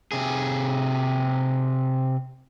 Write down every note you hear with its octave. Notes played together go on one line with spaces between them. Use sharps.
C3 G#4